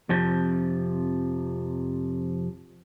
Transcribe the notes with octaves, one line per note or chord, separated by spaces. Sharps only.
F2 C3 F3